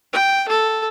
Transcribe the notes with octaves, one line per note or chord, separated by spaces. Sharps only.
G5
A4